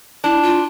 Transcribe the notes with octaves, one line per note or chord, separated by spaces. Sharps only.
D4 E4
F4